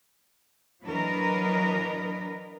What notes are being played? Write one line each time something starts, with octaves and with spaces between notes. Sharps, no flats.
E3 F#3 D4 A#4 B4 D#5